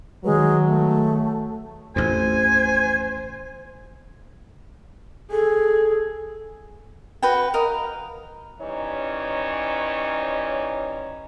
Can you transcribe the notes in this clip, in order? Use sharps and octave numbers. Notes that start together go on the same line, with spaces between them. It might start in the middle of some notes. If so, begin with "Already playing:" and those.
D#3 F#3 G#3 G#4 B4
A3
A1 F2 C5 G#5
G#4 A4
F#4 B4 G5
A#4 D#5 F5
E3 G3 C#4 D#4 C#5